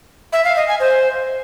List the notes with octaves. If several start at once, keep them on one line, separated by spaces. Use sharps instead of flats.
E5
F5
D#5
G#5
C5